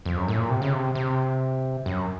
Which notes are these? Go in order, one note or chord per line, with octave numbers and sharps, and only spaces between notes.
F2
F#2
A2
A#2
C3
C#3
C3
C3
F#2